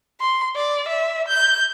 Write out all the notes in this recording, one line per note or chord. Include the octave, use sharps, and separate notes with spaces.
C6
D5
E5
G6